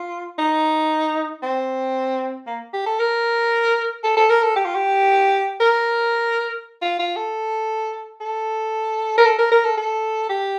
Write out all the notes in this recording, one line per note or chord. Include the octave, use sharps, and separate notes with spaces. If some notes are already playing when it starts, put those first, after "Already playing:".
Already playing: F4
D#4
C4
A#3
G4
A4
A#4
A4
A4
A#4
A4
G4
F4
G4
A#4
F4
F4
A4
A4
A#4
A4
A#4
A#4
A4
A4
G4